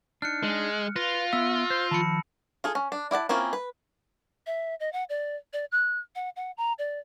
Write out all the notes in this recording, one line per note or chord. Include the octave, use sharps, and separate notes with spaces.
D4 D#4 F6 F#6 C#7
G#3
F4 B4 A#6
B3 E5 E6
C5
D#3 F3 A5 B5 C#7
F4 G#4 A4
C#4
D4
E4 D5 F#5 A5
A#3 C4 C#4 E4 F4
B4
E5
D#5
F#5
D5
D5
F#6
F#5
F#5
A#5
D5